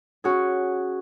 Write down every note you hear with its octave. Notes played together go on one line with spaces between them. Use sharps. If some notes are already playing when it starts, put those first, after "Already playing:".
C#4 F#4 G#4